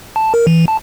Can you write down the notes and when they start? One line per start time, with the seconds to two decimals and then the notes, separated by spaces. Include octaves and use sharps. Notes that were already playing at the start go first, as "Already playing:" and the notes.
0.16 A5
0.34 A#4
0.47 E3
0.68 A5